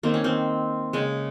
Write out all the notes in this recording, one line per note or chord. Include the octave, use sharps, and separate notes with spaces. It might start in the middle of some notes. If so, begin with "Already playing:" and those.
D#3 A#3 C4
C#4
C4
C#3 G#3